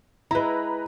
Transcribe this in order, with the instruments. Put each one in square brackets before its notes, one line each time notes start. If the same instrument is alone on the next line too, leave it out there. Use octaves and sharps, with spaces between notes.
[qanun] G#3 E4 [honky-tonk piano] B4 A#5